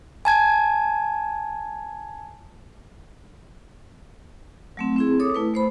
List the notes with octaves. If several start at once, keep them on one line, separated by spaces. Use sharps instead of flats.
G#5 A5 G#6
F#3 A3 C4
C4 E4 G#4
A4 C#5 D6 D#6
A3 E4 B4
A3 C5 B5